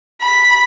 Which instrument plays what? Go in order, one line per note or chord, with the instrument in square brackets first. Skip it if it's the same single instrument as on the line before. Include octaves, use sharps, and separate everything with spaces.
[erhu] B5